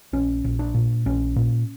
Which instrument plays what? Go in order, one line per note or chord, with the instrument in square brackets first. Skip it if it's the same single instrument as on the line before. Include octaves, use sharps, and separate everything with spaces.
[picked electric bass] A#1 C#4
A#1
D4
A#2
A#1 C#4
A#2